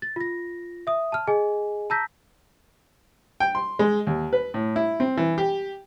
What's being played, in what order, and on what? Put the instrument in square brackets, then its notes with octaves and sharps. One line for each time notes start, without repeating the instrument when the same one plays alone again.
[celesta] A6
F4 A#6
E5 D#6
A5 F6
G#4 D#5 G#5
A5 A#5 E6 G6 A#6 B6
[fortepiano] G5
C6
G#3
D#2
B4
A2
E4
C4
E3
G4